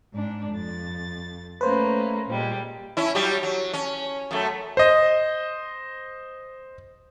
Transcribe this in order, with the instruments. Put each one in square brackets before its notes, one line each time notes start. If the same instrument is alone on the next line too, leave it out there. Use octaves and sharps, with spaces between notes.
[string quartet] G#2 D4
F2 A6
[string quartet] A3 A#3 C#4 [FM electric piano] B4 C5
[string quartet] A#2 G3 G#3
[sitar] C#4 E4
F#3 G3 G4
F#3
C#4
F#2 A3
[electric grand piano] C5 D#5